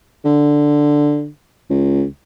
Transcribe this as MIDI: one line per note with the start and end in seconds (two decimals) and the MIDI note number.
0.25 1.27 50
1.69 2.04 37